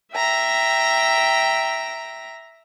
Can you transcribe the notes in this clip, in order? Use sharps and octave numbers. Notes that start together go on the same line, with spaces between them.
E5 G5 A#5